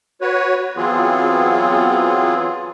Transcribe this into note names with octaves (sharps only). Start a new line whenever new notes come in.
F#4 B4 C#5
E3 F#3 B3 C4 F4 G#4